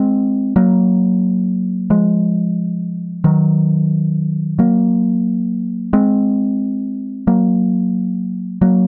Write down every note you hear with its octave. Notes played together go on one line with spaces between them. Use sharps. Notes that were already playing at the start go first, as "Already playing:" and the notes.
Already playing: G#3 C4
F#3 A#3
F3 G#3
D#3 F#3
F#3 A#3
G#3 C4
F#3 A#3
F#3 A#3